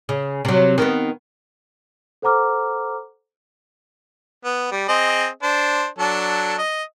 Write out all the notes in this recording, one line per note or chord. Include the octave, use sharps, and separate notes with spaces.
C#3
C3 F#3
D#3 B3
A4 C5 F#5 A#5 D6 F6
B3
G3
C4 G#4 D#5
D4 C5
F#3 D4 A4
D#5